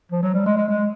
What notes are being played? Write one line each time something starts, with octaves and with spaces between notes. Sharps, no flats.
F3
F#3
G3
G#3
G#3
G#3